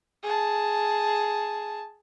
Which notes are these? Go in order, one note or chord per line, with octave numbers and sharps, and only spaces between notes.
G#4 A5